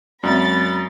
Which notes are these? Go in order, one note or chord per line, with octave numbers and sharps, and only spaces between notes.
F#2 F#3 G#3 C4 B5 A6